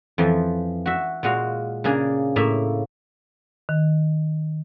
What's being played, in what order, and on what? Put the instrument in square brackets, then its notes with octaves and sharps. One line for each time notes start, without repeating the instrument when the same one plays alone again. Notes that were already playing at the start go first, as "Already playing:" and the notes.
[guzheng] F2 E3 F3
F#4 E5
A#2 G#3 F#4 F5
C#3 A#3 D4 G#4
A2 A#3 E5
[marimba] D#3